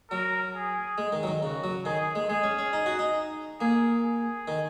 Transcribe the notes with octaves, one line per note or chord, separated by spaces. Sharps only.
F#3 A#4
G#4
G#3
D#3
F#3
D#3
C#3 F#4
F#3
D#3 G#4
G#3
G#3 G#4
C#4
C#4
D#4
F#4
D#4
A#3 G#4
G#4
D#3